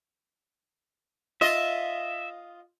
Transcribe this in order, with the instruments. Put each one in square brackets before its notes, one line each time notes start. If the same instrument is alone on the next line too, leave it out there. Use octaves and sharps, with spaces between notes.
[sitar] F4 D#5 [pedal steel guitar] E5